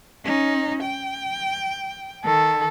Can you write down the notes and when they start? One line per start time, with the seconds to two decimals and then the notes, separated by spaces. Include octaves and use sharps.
0.24 C#4 D#4
0.83 G5
2.25 D#3 A4